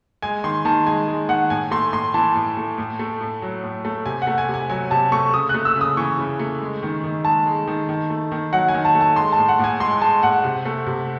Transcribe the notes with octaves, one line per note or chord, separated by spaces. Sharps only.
G#3 G#5
D#3 C6
D#3 A5
G#3 G#5
G#3
D#3 F#5
A2 G#5
A3 C6
A2 C6
E3 A5
A2
A3
A2
A3
A2
F#3
A2
A3
C3 G#5
F#5
A3
G#5
C3
G#5
F#3 G#5
C3 A5
A3 C#6
C#3 D#6
F#6
A3
E6
C#3
D#6
E3 C#6
C#3
A3
G#3
D#3
D#3
G#3 A5
G#3
D#3
D#3
A3
D#3
F#3 F#5
G#5
D#3
A5
A3
A5
G#3 C6
A5
A2
F#5
A2 G#5
G#3 C6
G#3 A5
A2 F#5
C3
A3
C3